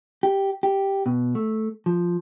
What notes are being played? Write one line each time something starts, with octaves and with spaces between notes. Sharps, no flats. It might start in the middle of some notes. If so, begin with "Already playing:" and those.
G4
G4
B2
A3
F3